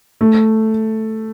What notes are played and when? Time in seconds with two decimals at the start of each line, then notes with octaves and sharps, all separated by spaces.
0.21 A3